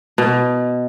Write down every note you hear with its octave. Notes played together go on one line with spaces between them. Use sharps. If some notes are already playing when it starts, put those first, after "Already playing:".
B2